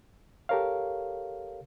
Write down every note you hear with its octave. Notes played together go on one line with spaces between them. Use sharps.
G4 A4 A#4 C#5 F5